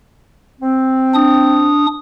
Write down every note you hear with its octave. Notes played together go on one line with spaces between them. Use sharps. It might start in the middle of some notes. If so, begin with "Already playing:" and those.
C4
D4 D#6